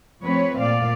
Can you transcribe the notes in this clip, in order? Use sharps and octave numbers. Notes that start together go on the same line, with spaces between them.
F3 A3 C4 B4 C#5
A#2 D5 F5